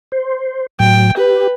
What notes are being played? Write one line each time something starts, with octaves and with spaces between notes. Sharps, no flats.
C5
A2 F#3 G5
G4 B4